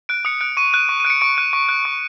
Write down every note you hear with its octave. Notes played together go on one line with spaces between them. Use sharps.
F#6 D7
D#6 C#7
F#6 D7
C#6 D#7
F#6 D#7
C#6
D#7
F#6 D7
C#7
C#6 D7
F#6 D#7
C#6
F#6
C#6